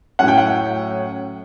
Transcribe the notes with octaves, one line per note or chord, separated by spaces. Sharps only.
A2 F#3 C#4 F#5
G5
F#5